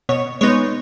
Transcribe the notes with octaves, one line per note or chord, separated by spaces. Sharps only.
B2 C#5
G#3 B3 D#4 C#5